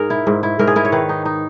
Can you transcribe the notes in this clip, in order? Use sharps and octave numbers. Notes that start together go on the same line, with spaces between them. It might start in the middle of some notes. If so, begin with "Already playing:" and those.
Already playing: G#2 G#4 A#4
E4
G#2
E4
G#2 A#4
G#4
E4 A#4
C#5
D#3 B4
D#4
D#4